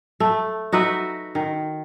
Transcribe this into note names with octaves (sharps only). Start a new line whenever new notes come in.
A3
D#4 F#4 B4 E5
D#3